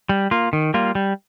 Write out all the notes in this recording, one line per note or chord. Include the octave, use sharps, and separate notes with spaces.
G3
A#3 F4
D#3
G3 A#3 F4
G3